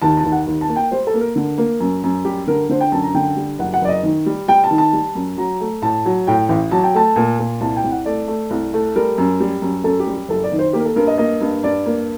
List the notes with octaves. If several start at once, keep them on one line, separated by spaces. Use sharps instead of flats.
D#2 A5
A5
D#2
F#5
D#2
A5
A#3
G5
G3 C5
A4
A#3
A#4
D3
A#3
F#2
F#2
G3 G4
D3 A#4
D3 C5
G5
F#2 A5
A#5
D3 G5
G3
F#1 F#5
F#5
F#1 D5
D#5
D#3
G3
G3 G5
A5
D#3
A5
G3
F#2
F#3 A#5
A3
A2 A5
F#3
A2 G5
A1
F#3 A5
G5
A3 A5
A#2
A#2
C2 A5
G5
C2
F#5
A3 D5
A3
C2
A3
G3 A#4
F#2
G3
F#2
F#2 A4
G4
G3
G4
F#1 A4
D5
D#3
C5
A#3 G4
A#4
A4
G2 A#4
D#5
A#3 D#5
G2
G2 D5
A#3